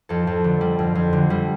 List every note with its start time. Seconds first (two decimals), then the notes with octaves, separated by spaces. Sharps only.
0.09 F2 A4
0.27 F2
0.44 D3
0.61 G3
0.79 F2
0.95 F2
1.13 D3
1.30 G3